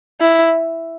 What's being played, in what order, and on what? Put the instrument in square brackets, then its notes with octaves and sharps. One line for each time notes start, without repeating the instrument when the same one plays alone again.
[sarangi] E4